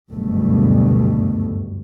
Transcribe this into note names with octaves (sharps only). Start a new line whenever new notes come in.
F#1 D2 G2 B2 A3